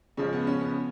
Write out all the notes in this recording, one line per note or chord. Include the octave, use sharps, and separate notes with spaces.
C#3 F3 G#3 C#4
B3
C#4
B3